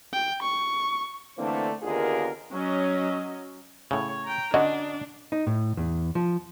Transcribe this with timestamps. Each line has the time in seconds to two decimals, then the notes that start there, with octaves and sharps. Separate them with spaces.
0.13 G5
0.42 C#6
1.38 D3 E3 A3 A#3 C4 D4
1.83 D#2 D3 B3 F4 G#4 A#4
2.52 F#3 C#4 D#5
3.91 A2 C#3 C#5
4.24 G5 A#5
4.54 D3 C#4 D4 F#4 D#5
5.32 D#4
5.47 A2
5.77 E2
6.15 F3